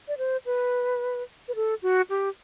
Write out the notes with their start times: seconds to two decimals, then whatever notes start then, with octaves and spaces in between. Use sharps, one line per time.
0.08 D5
0.18 C5
0.46 B4
1.48 B4
1.55 A4
1.82 F#4
2.10 G4